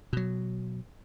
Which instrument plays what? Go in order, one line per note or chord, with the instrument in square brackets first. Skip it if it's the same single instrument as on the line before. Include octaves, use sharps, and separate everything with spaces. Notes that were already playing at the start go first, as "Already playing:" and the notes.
[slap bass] B2 F#3